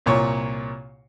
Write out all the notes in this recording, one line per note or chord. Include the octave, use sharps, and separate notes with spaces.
C2 A#2 C#5 C#6